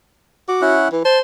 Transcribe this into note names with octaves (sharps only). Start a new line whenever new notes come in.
F#4 D6
C#4 E4 F#5
E3
C5 A5